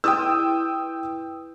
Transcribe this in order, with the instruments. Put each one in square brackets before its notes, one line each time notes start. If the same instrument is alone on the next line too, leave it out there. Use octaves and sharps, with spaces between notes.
[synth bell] E4 B4 [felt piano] G5 D#6 E6